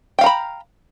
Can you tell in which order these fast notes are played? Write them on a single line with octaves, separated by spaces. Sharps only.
G5 F5 A#5 B5